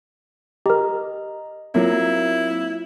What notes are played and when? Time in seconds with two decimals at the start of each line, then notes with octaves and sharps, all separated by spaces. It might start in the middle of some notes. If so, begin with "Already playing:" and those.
0.66 G4 A#4 D#5 A#5
1.75 F#3 A#3 C4 E4 F4